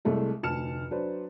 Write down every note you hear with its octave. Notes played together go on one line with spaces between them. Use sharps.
C2 G#3 A3 E4
F1 D2 A5 F6 C#7 E7
F#3 D4 B4 C5